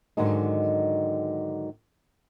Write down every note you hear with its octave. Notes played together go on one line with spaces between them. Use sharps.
G#2 D3 D#3 F#3 G#3 D#4